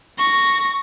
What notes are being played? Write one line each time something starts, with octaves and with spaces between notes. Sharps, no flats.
C#6 A#6